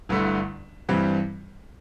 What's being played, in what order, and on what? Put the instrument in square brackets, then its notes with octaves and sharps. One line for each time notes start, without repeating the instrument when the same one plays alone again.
[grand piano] G1 G2 D3 A3 E4
G2 E3 G3 C4